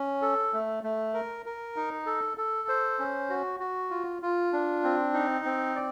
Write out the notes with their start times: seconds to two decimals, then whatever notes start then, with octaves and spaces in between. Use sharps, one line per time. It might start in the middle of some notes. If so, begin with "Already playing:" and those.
Already playing: C#4
0.22 A4
0.54 A3
0.83 A3
1.14 A#4
1.46 A#4
1.76 D#4
2.06 A4
2.38 A4
2.69 C5
2.99 C#4
3.30 F#4
3.60 F#4
3.91 F4
4.22 F4
4.53 D4
4.84 C4
5.14 D#4
5.45 C4
5.76 D5